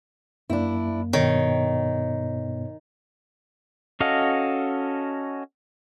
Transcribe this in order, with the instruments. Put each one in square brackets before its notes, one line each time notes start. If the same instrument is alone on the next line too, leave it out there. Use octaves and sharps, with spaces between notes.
[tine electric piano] F#2 A#3 [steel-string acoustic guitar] D4 E4
[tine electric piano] G2 B2 B3 [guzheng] D#3 [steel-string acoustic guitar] C#5
[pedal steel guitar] C#4 F#4 A4 D#5 F5